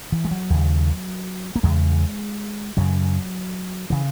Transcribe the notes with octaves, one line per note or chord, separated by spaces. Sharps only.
E3
G#3
F#3
D#2 C#3
A#3
E2 C#3 G#3
F#2 C#3 F#3
C#3 E3